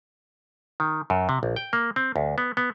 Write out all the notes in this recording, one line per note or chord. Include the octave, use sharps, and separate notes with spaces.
D#3
F#2
C3
A#1
G5
A#3
C4
D2
B3
B3